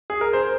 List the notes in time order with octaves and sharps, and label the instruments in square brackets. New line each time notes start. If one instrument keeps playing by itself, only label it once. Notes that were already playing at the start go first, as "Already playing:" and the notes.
[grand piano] G#4
A#4
C5